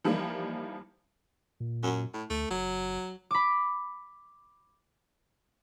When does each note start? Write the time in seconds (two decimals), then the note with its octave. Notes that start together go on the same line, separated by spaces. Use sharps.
0.04 E3 F3 G3 A#3 D#4
1.60 A#2
1.83 F#2
2.14 A2
2.30 D2 A3
2.51 F#1 F#3
3.31 B5 D6